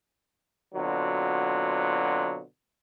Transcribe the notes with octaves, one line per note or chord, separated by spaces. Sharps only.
B2 D3 F#3 C4 F4